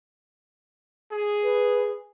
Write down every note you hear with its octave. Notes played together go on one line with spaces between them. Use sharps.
G#4
B4